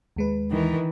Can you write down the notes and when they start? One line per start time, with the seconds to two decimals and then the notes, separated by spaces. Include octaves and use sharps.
0.16 D#2 G#3 B4
0.51 D#3 E3